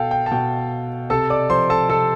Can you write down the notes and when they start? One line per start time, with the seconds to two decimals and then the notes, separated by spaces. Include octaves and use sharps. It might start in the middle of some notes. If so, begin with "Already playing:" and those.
Already playing: B2 A4 F5 G5 A5
0.11 G5
0.26 A5
0.31 B2 G5
1.10 C3 A4 A5
1.30 D5 D6
1.50 F3 C5 C6
1.70 A4 A5
1.89 C3 A4 A5